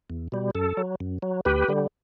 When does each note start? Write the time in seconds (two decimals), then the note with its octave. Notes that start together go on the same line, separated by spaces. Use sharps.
0.10 E2
0.32 B2 G3
0.55 F#2 A4
0.77 F#3
1.00 F#2
1.22 F#3
1.45 D2 G4 B4
1.68 D3 G3